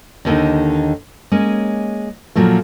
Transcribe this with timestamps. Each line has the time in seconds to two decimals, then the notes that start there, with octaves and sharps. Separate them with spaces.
0.25 D#2 D3 D#4
1.31 G#3 A#3 C#4
2.36 A#2 F3 F#3 A3